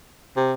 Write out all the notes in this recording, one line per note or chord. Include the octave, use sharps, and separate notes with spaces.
C3